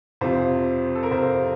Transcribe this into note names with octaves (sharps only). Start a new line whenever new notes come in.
F2 C3 F3 C5
A4
A#4
F2 C3 F3 C5